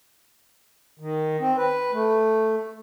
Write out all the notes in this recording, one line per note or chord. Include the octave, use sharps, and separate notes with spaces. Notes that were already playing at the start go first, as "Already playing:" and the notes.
D#3
C4
B4
A3